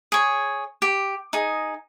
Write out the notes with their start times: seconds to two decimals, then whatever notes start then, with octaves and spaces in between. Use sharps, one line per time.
0.12 G#4 C#5
0.82 G4
1.33 D#4 G#4